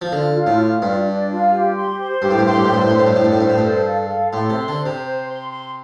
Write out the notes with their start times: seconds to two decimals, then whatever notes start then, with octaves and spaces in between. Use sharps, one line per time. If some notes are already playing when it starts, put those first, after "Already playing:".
0.02 F3
0.12 D3 F4
0.35 F4
0.47 A2
0.58 F4
0.82 G2 D5
1.05 D4
1.29 F4
1.52 G4
1.75 C6
1.99 C5
2.22 G2 G4
2.31 A2
2.39 G2
2.46 A2 C6
2.56 G2
2.65 A2
2.70 G2 C5
2.82 A2
2.90 G2 C5
2.99 A2
3.07 G2
3.16 A2 C5
3.24 G2
3.32 A2
3.39 G2 C5
3.50 A2
3.58 G2 A4
3.86 F5
4.09 A4
4.33 A2 C6
4.50 C3
4.56 C6
4.68 D3
4.79 C5
4.86 C3
5.02 C5
5.27 C6
5.49 C6